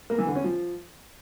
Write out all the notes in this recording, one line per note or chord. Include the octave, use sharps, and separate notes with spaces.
A#3
E3
D3
C#4
F3